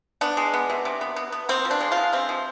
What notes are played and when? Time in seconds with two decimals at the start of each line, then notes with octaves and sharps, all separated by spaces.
0.21 B3 D4
0.37 G#3
0.54 B3
0.70 C3
0.85 C3
1.01 B3
1.16 B3
1.32 B3
1.49 B3 C4
1.65 F3
1.71 D4
1.81 G#3
1.92 F4
1.97 G#3
2.13 C3 C4
2.29 F3